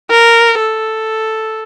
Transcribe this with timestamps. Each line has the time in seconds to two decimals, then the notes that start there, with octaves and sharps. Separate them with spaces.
0.11 A#4
0.59 A4